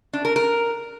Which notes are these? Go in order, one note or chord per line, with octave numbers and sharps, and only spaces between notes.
D4
A#4
A#4